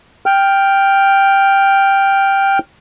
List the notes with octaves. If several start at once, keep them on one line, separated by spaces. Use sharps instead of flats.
G5 F6